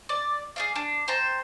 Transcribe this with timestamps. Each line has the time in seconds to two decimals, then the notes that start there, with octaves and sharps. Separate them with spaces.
0.09 D5
0.56 G#4 D5 F5
0.75 D4
1.08 C5 G5 A5 A#5